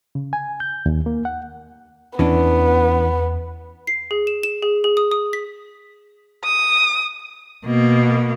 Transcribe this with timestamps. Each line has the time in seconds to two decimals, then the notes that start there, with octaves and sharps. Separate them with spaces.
0.15 C#3
0.33 G#5
0.60 G6
0.86 D#2
1.06 A#3
1.25 F#5
2.19 E2 E3 B3 C#4 D4
3.87 C7
4.11 G#4
4.27 E7
4.43 E7
4.63 G#4
4.84 G#4
4.97 D#6
5.11 D#6
5.33 B6
6.44 D#6
7.65 B2 A#3